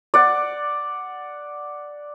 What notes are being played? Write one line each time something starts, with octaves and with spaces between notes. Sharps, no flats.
D5 F#5